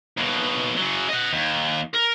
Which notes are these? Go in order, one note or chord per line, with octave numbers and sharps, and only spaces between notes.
D#2 B2
C#3 F#3
D#5 F#5
D#2
A#4